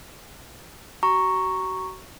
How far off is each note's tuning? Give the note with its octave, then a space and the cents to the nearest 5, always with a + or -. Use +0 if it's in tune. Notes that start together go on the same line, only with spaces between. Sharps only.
F#4 +35 A#5 +0 C#6 +0